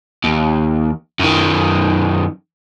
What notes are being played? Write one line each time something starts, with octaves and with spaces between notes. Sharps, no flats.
D#2
F#2 D#3